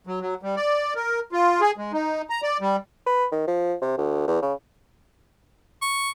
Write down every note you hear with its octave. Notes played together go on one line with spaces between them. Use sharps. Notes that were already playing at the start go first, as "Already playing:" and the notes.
F#3
F#3
G3
D5
A#4
F4
G#4
G#3
D#4
A#5
D5
G3
B4
D#3
F3
C3
D2
E2
C#3
C#6